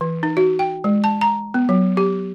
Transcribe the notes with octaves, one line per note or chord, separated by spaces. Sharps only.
E3
D#4
F#4
G5
G#3
A5
A#5
B3
F#3
G4